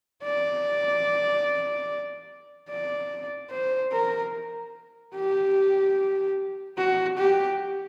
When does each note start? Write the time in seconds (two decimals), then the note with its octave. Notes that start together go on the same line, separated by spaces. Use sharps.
0.24 D5
2.69 D5
3.51 C5
3.92 A#4
5.15 G4
6.78 F#4
7.18 G4